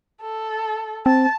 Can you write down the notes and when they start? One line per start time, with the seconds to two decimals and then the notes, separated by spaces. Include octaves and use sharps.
0.22 A4
1.06 C4 A5